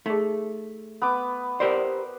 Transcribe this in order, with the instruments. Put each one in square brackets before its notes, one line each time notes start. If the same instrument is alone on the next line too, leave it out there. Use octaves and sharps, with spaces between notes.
[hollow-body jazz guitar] A3 [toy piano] D#4 G#4
[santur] B3 B4 D6
[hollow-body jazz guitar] G4 A#4 C5 [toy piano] D5